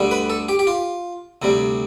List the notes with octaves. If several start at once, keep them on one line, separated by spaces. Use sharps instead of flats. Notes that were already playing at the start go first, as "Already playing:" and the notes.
Already playing: D2 D3 G3
B4
A4
G4
G4
F4
D2 C3 G3